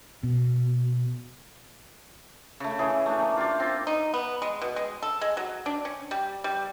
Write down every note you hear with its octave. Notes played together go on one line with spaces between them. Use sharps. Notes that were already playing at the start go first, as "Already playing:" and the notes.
B2
C#3 A3
C#3 E3 G#4 C#5
A3 D4
A#3
F4 G4 D5
C4 F4
D#4
B3
G#3
B2
G#3
A4
G#3
F#3
D4
C#4
G3
G3